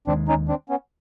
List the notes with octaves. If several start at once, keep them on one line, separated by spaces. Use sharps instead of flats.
D#2 D#3 G#3 C4 D4
C#4 D#4
C4 D4
B3 C#4